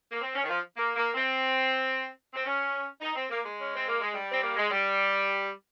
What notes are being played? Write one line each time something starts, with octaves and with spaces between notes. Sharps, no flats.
A#3
C4
C#4
D#3
F3
A#3
A#3
C4
C4
C#4
D#4
C4
A#3
G#3
C#4
C4
A#3
G#3
G3
C4
A#3
G#3
G3